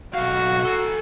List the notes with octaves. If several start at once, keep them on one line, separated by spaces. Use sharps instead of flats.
B1 F#4 F5
A4 G#5